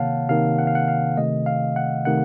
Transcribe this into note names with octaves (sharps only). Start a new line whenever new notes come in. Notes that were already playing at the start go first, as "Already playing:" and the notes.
Already playing: C3 D#3 A#3 C#5 F5 F#5 A5
C3 D#3 A#3 F5
F#5
F5
F#5
F5
C3 D#3 A3 D#5
F5
F#5
C3 D#3 A3 F#5